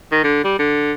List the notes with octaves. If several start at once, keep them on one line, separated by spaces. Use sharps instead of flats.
D#3
D3
G3
D3